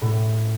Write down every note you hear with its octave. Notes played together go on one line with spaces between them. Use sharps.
A2